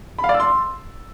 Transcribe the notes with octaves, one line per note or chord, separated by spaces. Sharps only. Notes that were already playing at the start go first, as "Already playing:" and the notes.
B5
F5
D5
E6
C6